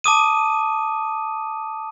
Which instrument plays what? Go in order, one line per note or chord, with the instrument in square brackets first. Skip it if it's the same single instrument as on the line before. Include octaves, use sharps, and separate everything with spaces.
[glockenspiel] A5 D6 D#6 D#7